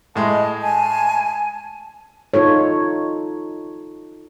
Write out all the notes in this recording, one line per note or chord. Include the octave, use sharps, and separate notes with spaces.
A2 G#3 D#5 A5
G#5 A5
D#4 F4 A4 C#5